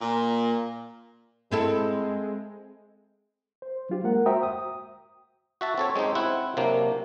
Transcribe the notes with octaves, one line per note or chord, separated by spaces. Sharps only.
A#2
G#3 C4 E4 A4
C5
F#3 D4 F4 G4
G#3 A#3 A#4 F#5
F#4 C5 E5 G5 A#5 D#6
D#6
F#4 E5 A5
C4 A4 C#5
G#3 C4 C#4 D#4 G4
C4 E4 F#5
C3 F#3 A#3 D4